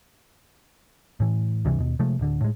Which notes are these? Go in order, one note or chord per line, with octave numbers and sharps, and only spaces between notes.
A2 E3
C#2 G2 C3 E3
D#2 B2
C3 F3 G#3 A3
D1 D3
A2 G#3